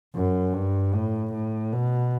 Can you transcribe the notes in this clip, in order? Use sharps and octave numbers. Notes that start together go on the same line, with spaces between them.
F#2
G2
A2
A2
B2